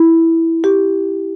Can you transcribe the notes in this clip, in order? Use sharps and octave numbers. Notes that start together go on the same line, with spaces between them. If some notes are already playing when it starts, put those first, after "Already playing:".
Already playing: E4
G4